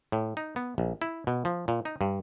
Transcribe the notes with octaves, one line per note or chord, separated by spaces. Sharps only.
A2
D#4
B3
A#1
E4
B2
F3
A#2
D#4
G2